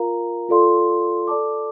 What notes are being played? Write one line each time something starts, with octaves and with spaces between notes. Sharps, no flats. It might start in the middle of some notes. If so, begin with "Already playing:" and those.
Already playing: F4 A#4 F5 A#5
F4 A4 D5 F5 C6
A4 D5 A5 D6